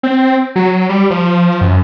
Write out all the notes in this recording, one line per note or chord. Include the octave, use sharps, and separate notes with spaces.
C4
F#3
G3
F3
F#2